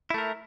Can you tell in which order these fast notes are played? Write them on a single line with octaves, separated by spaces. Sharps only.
E4 A3 A#4